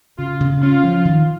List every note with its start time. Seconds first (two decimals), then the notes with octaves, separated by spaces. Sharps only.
0.18 C#3 F4
0.40 C#3
0.62 C#4 F4
0.84 F3
1.05 D#3